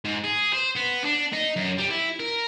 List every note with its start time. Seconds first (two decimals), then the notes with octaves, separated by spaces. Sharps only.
0.05 G#2
0.24 G#4
0.53 C5
0.76 B3
1.04 D4
1.33 D#4
1.56 F#2
1.78 G3
1.90 E4
2.20 A#4